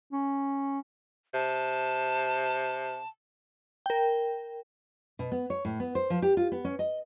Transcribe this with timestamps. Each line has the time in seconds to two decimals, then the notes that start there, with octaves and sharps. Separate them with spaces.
0.12 C#4
1.34 C3 A5
3.86 A#4 G5
5.19 B2
5.32 B3
5.50 C#5
5.65 A2
5.80 B3
5.95 C5
6.10 F3
6.22 G4
6.37 F4
6.52 B3
6.65 C#4
6.79 D#5